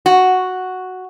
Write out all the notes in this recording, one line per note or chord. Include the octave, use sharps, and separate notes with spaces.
F#4